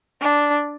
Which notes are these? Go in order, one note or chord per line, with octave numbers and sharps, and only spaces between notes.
D4